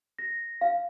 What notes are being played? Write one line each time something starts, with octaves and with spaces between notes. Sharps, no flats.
A#6
F5